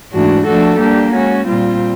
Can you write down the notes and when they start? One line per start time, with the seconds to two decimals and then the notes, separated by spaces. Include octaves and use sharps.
0.13 G#2 E3 A3 D4 F#4
0.47 F3 A3 D4 F#4 A4
0.80 G3 A#3 D4 G4
1.14 G#3 C#4 F#4
1.47 A#2 G3 C4 F4